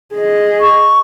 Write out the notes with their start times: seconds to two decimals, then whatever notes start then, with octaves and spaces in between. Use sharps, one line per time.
0.15 G#4 D#5
0.61 C#6